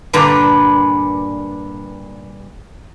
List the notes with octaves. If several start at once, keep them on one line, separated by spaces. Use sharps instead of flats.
G2 A#2 D3 D4 B4 A#5